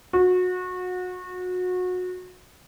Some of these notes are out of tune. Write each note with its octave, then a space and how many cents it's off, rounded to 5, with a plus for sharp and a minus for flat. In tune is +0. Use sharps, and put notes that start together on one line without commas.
F#4 -25